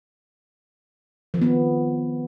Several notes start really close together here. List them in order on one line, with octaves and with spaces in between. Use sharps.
F3 D#3 B3